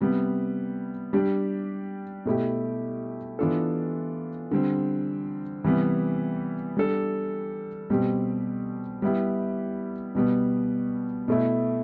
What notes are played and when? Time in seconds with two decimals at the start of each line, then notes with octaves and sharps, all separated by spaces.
0.01 C3 G3 B3
1.13 G3 D4 G4
2.25 B2 A3 E4 G4
3.39 E3 B3 D4 F4 A4
4.51 D3 G3 C4
5.64 C3 E3 G3 B3
6.77 G3 D4 A4
7.90 B2 G3 C4 G4
9.02 G3 B3 E4 G4
10.15 B2 G3 B3
11.28 B2 A3 E4